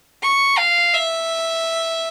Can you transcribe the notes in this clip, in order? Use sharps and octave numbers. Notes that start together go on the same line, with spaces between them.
C#6
F5
E5